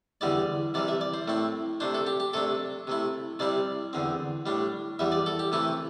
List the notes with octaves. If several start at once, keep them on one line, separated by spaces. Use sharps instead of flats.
E2 D3 G3 E4 D5
C3 E3 G3 D5
E5
D5
C5
A2 A3 C4 E4
C3 A3 D4 C5
A4
G4
G4
C3 A3 D4 A4
C3 A3 E4
C3 G3 C4 E4 D5
E2 D3 C4
A2 G3 D4
E2 E3 G3 E5
D5
A4
G4
C3 E3 A3 E4 G4